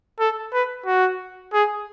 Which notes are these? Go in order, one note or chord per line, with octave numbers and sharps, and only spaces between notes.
A4
B4
F#4
G#4